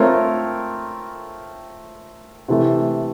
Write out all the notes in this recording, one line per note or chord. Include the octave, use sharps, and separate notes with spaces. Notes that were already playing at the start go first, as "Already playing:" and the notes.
Already playing: A3 C4 F4 A#4 C#5
C3 E3 A3